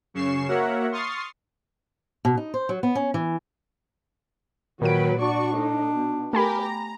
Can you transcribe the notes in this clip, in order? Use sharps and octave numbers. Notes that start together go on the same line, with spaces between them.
F#2 C#3 C#4 C#6 C7 E7
A#3 F#4 A#4 C#5 E5 F#5
C6 C#6 D#6 F6 A6 C7
B2
D#4
C5
F#3
B3
C#4
E3
A#2 D#3 F#3 B4 D7
D4 F#4 D5 C#6
A2 D#4
B2
A3 G4 A#4 G#5 B5
A#5